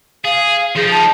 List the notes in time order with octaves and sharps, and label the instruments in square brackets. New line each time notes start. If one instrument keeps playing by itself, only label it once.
[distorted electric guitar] G#4 [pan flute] F5
[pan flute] F5
[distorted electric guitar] F3 D#4 [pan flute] G#4
[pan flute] A5